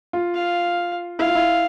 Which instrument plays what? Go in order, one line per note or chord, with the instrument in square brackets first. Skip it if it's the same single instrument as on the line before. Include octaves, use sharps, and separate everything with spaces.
[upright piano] F4
[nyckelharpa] F5
[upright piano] E4 [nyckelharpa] F5
[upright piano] F4
E4